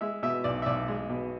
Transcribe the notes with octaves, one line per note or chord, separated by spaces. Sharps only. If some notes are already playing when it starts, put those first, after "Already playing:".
G#3 E5
B2 E5
B1 D5
E5
B1 D5
G#3
B2